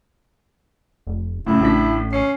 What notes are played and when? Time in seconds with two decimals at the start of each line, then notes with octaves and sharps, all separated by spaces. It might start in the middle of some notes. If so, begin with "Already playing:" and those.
1.07 F1
1.47 F#1 A2 C#3 E4
1.60 A1 A2 D4 B6
2.13 C#4 C7